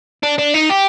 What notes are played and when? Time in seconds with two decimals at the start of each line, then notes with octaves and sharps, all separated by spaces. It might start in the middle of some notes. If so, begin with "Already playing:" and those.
0.23 D4
0.38 D4
0.54 D#4
0.70 G4